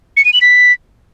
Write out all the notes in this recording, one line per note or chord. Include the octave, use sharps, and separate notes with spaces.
C#7
D#7
F#7
B6